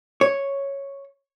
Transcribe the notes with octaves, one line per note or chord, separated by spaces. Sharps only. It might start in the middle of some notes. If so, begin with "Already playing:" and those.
C#5